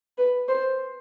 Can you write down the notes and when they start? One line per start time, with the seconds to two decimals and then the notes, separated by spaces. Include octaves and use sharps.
0.18 B4
0.48 C5